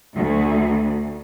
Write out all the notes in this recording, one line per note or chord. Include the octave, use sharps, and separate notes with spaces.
D2